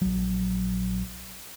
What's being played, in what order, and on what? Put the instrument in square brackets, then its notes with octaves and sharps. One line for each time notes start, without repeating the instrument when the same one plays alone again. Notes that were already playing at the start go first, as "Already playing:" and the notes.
[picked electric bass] A#1 F#3